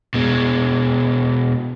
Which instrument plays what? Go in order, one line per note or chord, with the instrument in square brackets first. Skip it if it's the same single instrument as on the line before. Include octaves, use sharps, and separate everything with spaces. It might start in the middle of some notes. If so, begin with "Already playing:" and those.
[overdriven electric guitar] B2 G#3